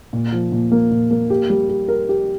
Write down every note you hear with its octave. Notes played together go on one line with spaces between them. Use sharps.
A#2
F3
A#2
A#3
A#2
A#3
G4
G3
G4
A#4
G4